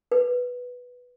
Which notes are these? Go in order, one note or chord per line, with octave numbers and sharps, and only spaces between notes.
B4